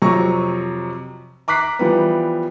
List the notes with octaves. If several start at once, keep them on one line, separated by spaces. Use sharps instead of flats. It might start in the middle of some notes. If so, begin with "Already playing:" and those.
F2 C3 F#3 A#5 C#6
A#5 D6 F#6 B6 C7
E3 F3 G3 B3